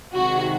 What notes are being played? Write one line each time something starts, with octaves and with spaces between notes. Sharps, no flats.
C3 D#3 G#3 F#4